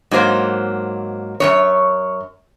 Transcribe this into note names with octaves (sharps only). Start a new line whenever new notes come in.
G#2 F#3 A#3 C5
F#2 B2 C#5